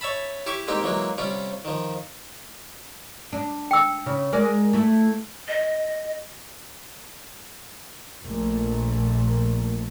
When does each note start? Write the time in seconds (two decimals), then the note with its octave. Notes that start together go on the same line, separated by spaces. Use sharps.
0.01 C#5 E5 A5 B5
0.46 E4 G4 E5 C#6 D6
0.68 G#3 A#3 C4 D#4 G4
0.83 E3 F#3 G#3 A#3
1.18 C3 G3 C#4 F4
1.65 D#3 F3
3.33 D4
3.71 G5 E6
4.06 C#3
4.32 G#3 A#4 D5
4.73 A3 E4
5.48 D#5
8.23 A#1 A#2 A3